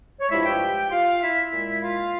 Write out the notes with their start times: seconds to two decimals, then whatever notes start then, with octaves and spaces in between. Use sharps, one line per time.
0.20 C#5
0.30 G2 F3 G#3 E4 E5
0.45 G4 G5
0.90 F4 F5
1.22 E4 E5
1.51 A#2 G#3
1.82 F4 F5